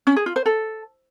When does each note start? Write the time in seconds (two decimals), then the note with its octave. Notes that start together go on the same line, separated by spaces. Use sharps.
0.07 C#4
0.16 G#4
0.26 F4
0.36 C5
0.46 A4